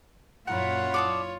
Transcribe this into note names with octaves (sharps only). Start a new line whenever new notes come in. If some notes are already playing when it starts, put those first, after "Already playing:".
F#2 A#2 E4 F4 A#4 B4 C#5 F#5
D5 A5 D#6